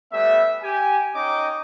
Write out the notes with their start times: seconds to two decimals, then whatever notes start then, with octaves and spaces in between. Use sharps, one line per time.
0.12 G3 A3 B3 E5
0.62 G4 G#5
1.14 C#4 D#4 D#5 G5 D6